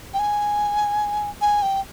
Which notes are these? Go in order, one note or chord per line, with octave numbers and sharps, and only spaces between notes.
G5
G#5
G#5
G5